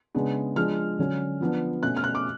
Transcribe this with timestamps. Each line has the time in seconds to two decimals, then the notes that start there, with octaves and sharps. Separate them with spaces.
0.14 C#3 G#3 B3 D4
0.56 F3 G#3 D4 F6
0.99 D3 F#3 C#4
1.41 F3 B3 D4
1.83 B2 A3 C#4 F#6
1.97 F6
2.04 F#6
2.15 D6